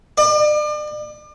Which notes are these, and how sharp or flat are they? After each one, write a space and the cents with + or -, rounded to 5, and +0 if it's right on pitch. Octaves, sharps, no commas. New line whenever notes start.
D5 +40